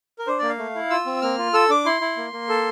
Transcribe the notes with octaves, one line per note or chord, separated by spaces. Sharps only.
A#4
D4 C5
A#3 D5
F5
A3
E4
F4 E6
C4
A#3 F6
F4
A4 E6
D4 D6
E4 C6
E4
A#3
A#3
A4